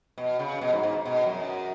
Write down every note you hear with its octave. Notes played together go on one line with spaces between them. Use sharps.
B2
C#3
B2
G#2
G#2
B2
F#2